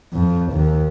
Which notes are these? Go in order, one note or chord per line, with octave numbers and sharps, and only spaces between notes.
F2
D#2